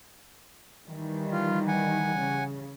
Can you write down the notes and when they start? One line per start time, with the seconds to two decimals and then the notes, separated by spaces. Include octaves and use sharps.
0.87 D#3 E3 G3
1.32 F4
1.68 F#5 G#5
2.18 C#3